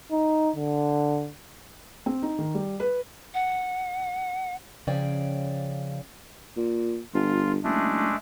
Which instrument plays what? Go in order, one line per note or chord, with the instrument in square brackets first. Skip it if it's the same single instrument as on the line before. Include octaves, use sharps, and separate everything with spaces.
[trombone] D#4
D3
[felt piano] C4
D#4
D#3
G3
B4
[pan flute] F#5
[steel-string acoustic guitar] C#3 F3 C#4 D5 G5
[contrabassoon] A#2
[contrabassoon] G1 [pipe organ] F4
[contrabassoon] F#1 [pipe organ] G#3 A3 D4